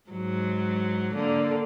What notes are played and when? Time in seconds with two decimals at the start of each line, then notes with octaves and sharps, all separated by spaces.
0.10 G#2 F#3
1.14 D3 A#3